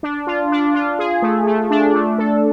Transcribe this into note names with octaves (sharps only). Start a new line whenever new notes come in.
D4
F4
D4
F4
G#4
A3
A3
D4
A3
A4